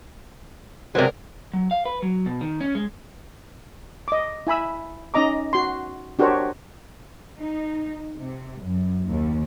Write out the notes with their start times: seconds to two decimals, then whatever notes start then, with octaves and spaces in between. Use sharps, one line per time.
0.95 C3 F#3 G#3 B3 A#4 C5 D5
1.53 F#3
1.71 F5
1.85 B4
2.02 F#3
2.26 B2
2.41 D#3
2.60 C#4
2.75 G#3
4.08 D#5 D6
4.47 E4 G#5 B5 E6
5.14 C#4 D#4 D#5 A#5 D6
5.53 F#4 C6
6.19 D4 F#4 G4 A#4 C5 C#5
7.39 D#4
8.18 C3
8.64 F#2
9.09 D#2